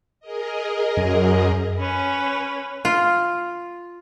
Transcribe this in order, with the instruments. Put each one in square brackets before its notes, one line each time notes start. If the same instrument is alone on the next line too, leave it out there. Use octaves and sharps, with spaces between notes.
[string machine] G#4 A#4 D#5
[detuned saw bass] F#2
[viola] C#4 B4
[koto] F4